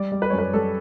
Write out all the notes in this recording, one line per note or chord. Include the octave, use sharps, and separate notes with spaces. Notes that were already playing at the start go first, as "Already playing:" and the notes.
Already playing: G3 D5
G3
B4
F#2 C#5
B4
G3 A4